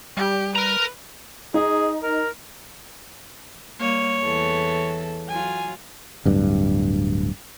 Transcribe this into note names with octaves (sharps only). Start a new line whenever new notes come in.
G3 G4
A#4 B4 A#5
D#4 G#4
A#4
G3 A#3 C#5
E2 E3 A4
F#3 F4 G#5
D1 G2